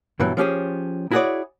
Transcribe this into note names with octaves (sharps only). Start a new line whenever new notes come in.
G2 B2 E3 F#3
F3 C#4 G4 G#4
E4 F#4 G#4 A4 C#5 D5